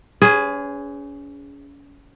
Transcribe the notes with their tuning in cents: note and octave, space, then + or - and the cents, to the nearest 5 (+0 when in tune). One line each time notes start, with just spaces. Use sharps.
C#4 +35 G#4 +0 C5 -40